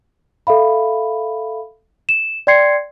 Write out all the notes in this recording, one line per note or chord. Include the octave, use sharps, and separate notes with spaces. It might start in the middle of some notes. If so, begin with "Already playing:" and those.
A4 E5 F5 B5
E7
D5 G5 C6 G#6 C7 C#7